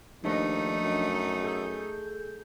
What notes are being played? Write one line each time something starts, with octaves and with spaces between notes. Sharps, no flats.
D#2 F3 A3 D4 D#4 D#5
F#2
G#4 A4 G6